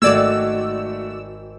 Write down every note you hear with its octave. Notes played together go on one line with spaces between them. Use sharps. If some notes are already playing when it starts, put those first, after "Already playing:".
G#1 A3 C4 F#4 D5 E6 G#6